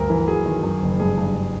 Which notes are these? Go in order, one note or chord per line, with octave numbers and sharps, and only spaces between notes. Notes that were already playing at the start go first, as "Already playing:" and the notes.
Already playing: D2 G2 A#4
E3
F#3 G#4
D#3
F#2
F#1
G2 G#4
G2